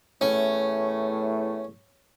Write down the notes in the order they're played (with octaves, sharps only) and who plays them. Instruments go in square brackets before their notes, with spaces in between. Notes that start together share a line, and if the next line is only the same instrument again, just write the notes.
[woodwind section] E2 A2 A3 [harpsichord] C#4